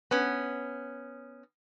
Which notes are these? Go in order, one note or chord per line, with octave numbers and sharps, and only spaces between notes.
B3 C#4